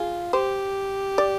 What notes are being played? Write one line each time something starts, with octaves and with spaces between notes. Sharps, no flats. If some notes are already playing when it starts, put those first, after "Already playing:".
Already playing: F4 G#4
G4 C5
D5